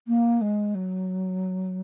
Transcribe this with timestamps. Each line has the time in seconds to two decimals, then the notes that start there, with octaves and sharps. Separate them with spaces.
0.07 A#3
0.41 G#3
0.75 F#3